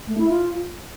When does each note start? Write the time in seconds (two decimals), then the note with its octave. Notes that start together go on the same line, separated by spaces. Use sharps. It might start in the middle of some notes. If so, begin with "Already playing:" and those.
0.07 A3
0.18 E4
0.29 F4